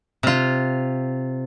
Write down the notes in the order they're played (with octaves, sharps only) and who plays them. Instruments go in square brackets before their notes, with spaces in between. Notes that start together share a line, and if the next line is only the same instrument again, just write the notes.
[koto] C3 F4